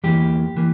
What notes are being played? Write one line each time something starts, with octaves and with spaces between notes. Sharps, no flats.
E2 E3 G3 A#3 G4
E3 A#3